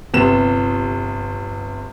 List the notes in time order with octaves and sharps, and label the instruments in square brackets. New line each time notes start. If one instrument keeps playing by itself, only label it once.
[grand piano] G1 C3 B3 E7